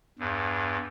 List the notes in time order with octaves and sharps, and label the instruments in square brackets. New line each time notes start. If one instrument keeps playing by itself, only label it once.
[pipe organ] E2 G2